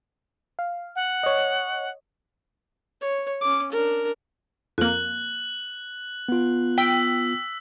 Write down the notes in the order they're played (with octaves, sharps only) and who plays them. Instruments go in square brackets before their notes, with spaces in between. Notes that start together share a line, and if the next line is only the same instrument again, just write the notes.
[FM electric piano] F5
[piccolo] F#5
[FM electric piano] C#5 D#5
[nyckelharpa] C#5
C#4 D6
D4 A#4
[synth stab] F2 A#3 [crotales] F#6 F#7
[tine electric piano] B3 F4
[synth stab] G5 [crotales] E6 B6